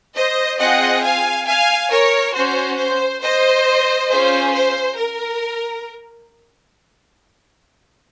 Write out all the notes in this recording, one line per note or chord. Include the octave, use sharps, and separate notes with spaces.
C5 D#5
C4 F4 G#4 D#5 F#5
F5 G#5
F5 G#5
A#4 C#5
C#4 F#4 C5
C5
C5 D#5
C#4 F4 G#4 C5
C5
A#4